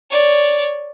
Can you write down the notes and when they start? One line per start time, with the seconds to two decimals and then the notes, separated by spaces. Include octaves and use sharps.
0.11 C#5 D5